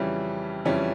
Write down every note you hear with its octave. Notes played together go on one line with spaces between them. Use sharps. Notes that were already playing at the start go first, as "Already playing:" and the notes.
Already playing: F2 C#3 E3 G3 C#4
F2 C#3 E3 G3 C#4